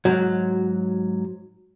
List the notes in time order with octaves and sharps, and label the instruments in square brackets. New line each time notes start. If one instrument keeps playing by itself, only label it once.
[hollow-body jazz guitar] G#2 F#3